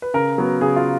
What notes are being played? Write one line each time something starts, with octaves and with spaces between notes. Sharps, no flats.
B4
C#3 A#4
F#3 B3
C#3 G#4
F4